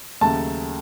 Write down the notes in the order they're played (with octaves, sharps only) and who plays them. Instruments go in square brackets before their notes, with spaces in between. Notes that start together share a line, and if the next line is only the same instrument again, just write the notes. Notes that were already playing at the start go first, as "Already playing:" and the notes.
[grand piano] D#2 C#3 F#3 A3 A5